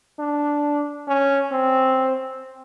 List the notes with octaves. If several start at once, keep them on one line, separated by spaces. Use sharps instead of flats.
D4
C#4
C4